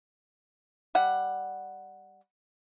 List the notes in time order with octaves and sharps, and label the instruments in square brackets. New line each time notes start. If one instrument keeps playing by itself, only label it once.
[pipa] G3 F#5